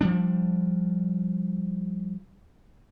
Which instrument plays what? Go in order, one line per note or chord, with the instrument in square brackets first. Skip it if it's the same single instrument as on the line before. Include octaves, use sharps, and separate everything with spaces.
[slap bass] F3 G3 D4